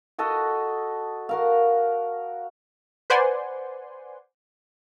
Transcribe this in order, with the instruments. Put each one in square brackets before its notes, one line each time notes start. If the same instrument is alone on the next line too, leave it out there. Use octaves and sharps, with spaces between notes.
[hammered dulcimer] F#4 A4 D#5 F#5
F#4 A#4 F5
[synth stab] B4 C5 D5 F#5 G#5 C6